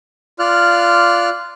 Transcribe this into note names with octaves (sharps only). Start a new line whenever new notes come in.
F4 D5 F6 F#6